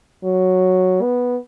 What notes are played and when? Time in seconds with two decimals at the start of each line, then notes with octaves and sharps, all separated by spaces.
0.24 F#3
1.02 B3